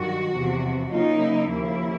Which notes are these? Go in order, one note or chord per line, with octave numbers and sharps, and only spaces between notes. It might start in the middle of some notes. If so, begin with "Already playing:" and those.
Already playing: G2 D#3 F#3 F#4
E2 C3 F3
C#3 F#3 A#3 D#4 F4
E4
D#2 C#3 F3 A#3